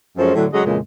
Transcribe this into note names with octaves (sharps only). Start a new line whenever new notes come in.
F#2 F3 G#3 C#4 A4 C5
A2 D3 F#3
C#3 F#3 G#3 A4 D#5 F#5
F2 A#2 C#3 E3 G#3